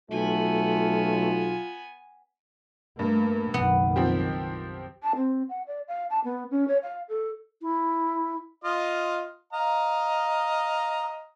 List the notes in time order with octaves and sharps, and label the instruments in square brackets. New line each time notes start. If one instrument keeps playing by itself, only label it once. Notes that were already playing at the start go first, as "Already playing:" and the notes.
[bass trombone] B1 [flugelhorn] A3 [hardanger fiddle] B3 G#5 [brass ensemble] F4
[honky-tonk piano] G2 [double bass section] A3 A#3
[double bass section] F#1 B1 D#3 [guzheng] B3
[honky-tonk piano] F3 C4 G4
[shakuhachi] A5
C4
F#5
D5
F5
A5
B3
C#4
C#5
F5
A4
[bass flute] E4
[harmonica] F4 D#5 F5
D#5 F5 A#5